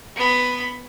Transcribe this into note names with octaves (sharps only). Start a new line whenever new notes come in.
B3 B5